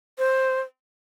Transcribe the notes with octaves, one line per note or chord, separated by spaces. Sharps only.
C5